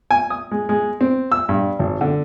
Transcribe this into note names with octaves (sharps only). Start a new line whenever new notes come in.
G#5
D#6
G#3
G#3
C4
E6
G2
G#1
D3